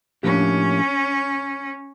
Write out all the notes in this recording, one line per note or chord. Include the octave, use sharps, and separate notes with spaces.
A2 F3 A#3 C#4 D4 G4